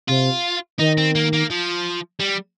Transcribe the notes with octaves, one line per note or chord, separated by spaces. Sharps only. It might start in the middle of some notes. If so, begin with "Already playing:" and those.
C3 F4
D#3 D#4
C4
A#3
A#3
F3
G3